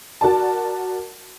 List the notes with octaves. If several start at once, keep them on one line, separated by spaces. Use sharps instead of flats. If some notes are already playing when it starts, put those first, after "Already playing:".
F#4 A#4 D5 A5